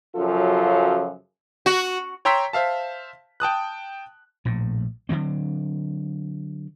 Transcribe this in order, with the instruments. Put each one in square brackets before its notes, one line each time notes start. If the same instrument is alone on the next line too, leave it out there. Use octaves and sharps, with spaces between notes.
[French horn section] F#2 C#3 F3 F#3 F4 A4
[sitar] F#4
[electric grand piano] C#5 G5 A#5 C6 E6 B6
C5 E5 F5 A5
G5 A5 D#6 F#6
[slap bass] A#1 A2
D3 E3 F#3 C4